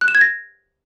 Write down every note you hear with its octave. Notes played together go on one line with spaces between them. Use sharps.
F#6
E7
G#6
A#6